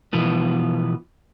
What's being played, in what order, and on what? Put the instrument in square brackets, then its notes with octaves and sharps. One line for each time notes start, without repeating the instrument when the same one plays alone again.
[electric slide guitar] B2 E3 F3 B3